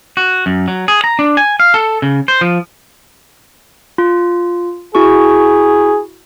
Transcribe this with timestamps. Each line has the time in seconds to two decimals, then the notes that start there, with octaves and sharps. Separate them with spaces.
0.17 F#4
0.46 F#2
0.68 F#3
0.88 G#4
1.04 A#5
1.19 D4
1.37 G#5
1.60 F5
1.74 A4
2.02 C#3
2.28 C5
2.41 F3
3.98 F4
4.95 E4 F#4 G#4 C#6